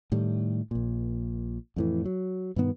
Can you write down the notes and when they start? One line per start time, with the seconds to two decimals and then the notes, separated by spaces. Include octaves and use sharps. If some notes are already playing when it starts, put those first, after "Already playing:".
0.12 A2 D#3 G3
0.71 A#1 A#2
1.76 F2 A2 E3
2.06 F#3
2.56 G2 B2 D#3 B3